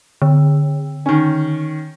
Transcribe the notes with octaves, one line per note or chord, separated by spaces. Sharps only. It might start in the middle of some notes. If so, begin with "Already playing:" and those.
D3
D#3 C#4